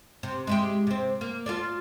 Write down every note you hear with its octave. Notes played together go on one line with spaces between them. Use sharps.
C3
G#3 E4 G4
C3 C4
A#3
F4 A4 D5